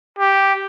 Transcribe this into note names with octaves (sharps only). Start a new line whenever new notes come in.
G4